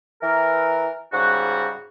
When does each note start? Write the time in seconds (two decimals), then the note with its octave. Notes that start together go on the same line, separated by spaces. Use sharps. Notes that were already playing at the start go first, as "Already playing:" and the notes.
0.22 E3 A#4
1.13 G#2 C#3 G3 F#4